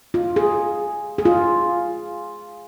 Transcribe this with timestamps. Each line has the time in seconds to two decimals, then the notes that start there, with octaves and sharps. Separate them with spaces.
0.14 F4
0.36 G#4
1.18 G#4
1.25 F4